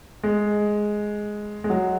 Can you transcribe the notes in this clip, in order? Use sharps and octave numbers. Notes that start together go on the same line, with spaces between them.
G#3
G#3
F#3